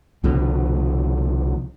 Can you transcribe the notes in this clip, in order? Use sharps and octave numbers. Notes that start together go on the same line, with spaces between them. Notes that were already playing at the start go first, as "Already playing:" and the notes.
C2 B2 D3 F3